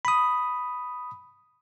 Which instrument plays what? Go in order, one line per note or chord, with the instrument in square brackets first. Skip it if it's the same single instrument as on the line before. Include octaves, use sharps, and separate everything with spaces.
[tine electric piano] B5 D#6